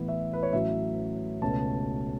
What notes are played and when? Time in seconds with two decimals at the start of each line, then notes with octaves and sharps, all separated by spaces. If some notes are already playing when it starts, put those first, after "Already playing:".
Already playing: A1 A2 E3 B3
0.08 E5
0.33 B4
0.43 C#5
0.53 A1 A2 F#3 C#4 E5
1.41 C#2 B2 A3 C#4 A5